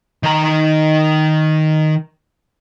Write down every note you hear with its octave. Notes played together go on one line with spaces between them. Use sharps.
D#3 A#5